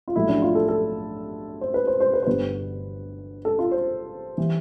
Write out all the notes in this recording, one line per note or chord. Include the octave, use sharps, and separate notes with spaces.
F4
B1 A2 F3 A3 E4
D4
F4
A4
A4
C5
B4
C5
C5
B4
C5
G1 G2 D3 G3 B3 B4
A4
F4
C5
E3 G3